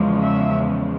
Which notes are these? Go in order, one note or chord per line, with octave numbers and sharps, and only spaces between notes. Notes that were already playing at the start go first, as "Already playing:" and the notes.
Already playing: E2 C#3 F3 G#3
E5